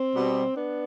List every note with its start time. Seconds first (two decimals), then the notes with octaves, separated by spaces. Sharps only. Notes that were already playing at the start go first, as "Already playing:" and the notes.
Already playing: C4
0.14 B2 G3
0.56 B3 D4